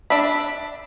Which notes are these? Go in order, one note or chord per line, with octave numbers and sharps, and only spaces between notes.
D4 E5 B5